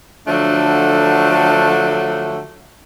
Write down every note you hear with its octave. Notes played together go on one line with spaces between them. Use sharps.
D3 F3 F#3 A3 D4